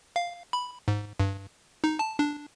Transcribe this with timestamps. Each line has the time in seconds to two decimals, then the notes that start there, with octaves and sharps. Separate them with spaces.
0.16 F5
0.53 B5
0.88 G#2
1.20 G2
1.84 D#4
1.99 A5
2.19 D4